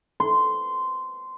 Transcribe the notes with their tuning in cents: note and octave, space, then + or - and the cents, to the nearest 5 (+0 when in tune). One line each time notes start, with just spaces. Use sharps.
C6 -15